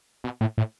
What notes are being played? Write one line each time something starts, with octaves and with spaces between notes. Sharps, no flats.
B2
A2
A2